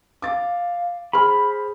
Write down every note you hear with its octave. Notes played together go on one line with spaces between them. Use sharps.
F5 D6 A6
G#4 C5 B5 C6 F6